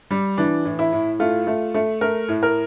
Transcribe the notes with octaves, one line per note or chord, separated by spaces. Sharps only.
G3
E3 D4
A2
E4
A2
A3 F4
A3
A3
A3 A#4
A2
A#4